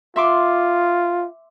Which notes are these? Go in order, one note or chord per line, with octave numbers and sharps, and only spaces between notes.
F4 E5 C6 D6